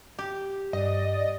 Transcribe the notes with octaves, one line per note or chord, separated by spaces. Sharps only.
G4
G2 D5 D#5